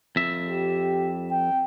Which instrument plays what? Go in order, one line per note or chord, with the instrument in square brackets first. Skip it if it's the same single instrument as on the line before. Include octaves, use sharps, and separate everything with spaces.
[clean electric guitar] F2 E5
[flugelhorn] G4
G5